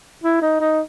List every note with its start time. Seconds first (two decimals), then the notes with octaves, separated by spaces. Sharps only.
0.24 E4
0.42 D#4
0.61 D#4